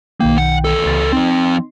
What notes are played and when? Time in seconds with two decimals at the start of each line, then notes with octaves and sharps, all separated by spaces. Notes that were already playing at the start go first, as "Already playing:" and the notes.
0.20 B1 D#3 A#3 G5
0.38 F#5
0.65 E2 A4
0.85 C#2 A6
1.12 F3 C4 D#4 C6